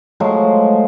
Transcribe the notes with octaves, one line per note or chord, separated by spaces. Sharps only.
F3 F#3 G#3 A3